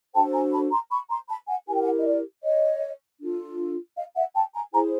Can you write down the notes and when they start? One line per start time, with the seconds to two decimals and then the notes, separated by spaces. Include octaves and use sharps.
0.15 D4 F#4 A4 C5 G5 A5
0.34 G#5 A#5
0.52 A5 B5
0.71 A#5 C6
0.91 B5 C#6
1.09 A#5 C6
1.29 A5 B5
1.48 F#5 G#5
1.67 E4 G4 A#4 G#5
1.74 G5
1.82 F#5 G#5
1.98 D#5
2.05 D5
2.43 C#5 D#5
3.20 D4 F4 A4
3.96 D#5 F5
4.16 E5 F#5
4.35 G5 A5
4.54 G#5 A#5
4.73 E4 G#4 C5 G#5 A#5